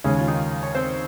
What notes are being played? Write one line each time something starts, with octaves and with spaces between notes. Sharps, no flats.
D#2 C#3 G#3 C#4
F4
D#3 D#4
C#5
C4 C5